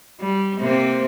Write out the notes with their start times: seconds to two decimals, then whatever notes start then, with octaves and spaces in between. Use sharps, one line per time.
0.20 G3
0.59 C3 A#3 C4